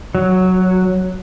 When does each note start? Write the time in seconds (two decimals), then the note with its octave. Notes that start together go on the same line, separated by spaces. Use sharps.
0.15 F#3